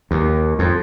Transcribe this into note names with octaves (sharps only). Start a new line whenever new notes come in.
D#2
F2